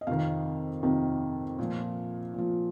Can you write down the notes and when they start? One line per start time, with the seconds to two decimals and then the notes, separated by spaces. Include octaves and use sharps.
0.01 D#5
0.07 F2 C3 D#3 F5
0.83 F2 C3 D#3
1.59 A#2 F3
2.34 A#2 F3